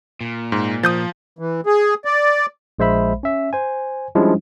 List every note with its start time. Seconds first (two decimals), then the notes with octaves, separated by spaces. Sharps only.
0.21 A#2
0.52 G#2
0.83 F3 D#6 G6 A6
1.39 E3
1.66 G#4
2.05 D5
2.79 A#1 G#3 C5 E5 B5
3.23 C#4 E5
3.53 C5 G#5
4.15 F3 G3 G#3 C#4 D4 E4